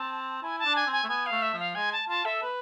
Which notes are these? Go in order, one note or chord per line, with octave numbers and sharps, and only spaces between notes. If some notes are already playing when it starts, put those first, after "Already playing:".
Already playing: C4 A5
E4 G#5
A5
D4
G#5
C4
G#5
A3
B3 G#5
F5
A3
E5
F3
F5
G#3 G#5
A5
F4 A5
A4 E5
B4